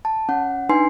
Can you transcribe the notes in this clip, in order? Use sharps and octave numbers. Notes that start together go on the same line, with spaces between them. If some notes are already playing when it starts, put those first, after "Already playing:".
A5
C#4 F#5
D4 D#4 B4 G#5 C6 C7